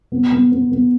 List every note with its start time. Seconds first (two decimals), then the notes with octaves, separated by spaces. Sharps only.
0.12 B3
0.32 B3
0.52 B3
0.72 B3